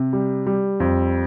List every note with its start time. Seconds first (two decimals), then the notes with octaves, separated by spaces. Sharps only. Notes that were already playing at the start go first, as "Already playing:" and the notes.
Already playing: C3
0.13 G3
0.46 G3
0.80 F2